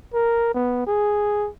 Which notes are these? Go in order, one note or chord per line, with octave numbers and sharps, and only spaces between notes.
A#4
B3
G#4